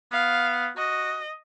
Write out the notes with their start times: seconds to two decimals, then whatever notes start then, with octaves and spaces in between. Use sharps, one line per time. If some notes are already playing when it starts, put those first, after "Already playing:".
0.12 B3 F5
0.77 F#4 D#5